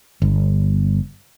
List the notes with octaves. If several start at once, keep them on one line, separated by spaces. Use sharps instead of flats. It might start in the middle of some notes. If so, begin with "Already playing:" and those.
G1